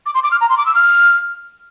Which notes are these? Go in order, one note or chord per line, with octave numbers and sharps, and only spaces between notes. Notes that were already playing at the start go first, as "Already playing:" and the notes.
D6
C6
D6
F6
A#5
C6
D6
E6
F6